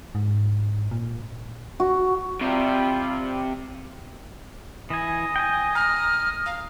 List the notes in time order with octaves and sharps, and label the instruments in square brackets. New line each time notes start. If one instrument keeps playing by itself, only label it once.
[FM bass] G#2
A#2
[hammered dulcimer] F#4
[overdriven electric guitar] C3 [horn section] G3 F4
[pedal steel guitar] E3 G#5 [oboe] D#5
[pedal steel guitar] G5 G#5
[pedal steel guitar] A#5 [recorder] F6
[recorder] F5